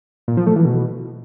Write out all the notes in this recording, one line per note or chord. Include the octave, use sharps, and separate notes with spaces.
A#2
F3
A3
E3
B2